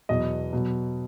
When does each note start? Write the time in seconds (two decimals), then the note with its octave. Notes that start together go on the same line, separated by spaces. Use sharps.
0.09 E2 B2 F#3 D#5
0.53 B2 F#3